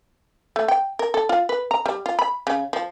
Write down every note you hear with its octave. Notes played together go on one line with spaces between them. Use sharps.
A3
G5
A#4
A4
F4
B4
A#5
G3
F4
B5
C#3
F3